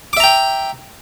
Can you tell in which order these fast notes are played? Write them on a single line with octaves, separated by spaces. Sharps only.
D6 E5 A#5 G5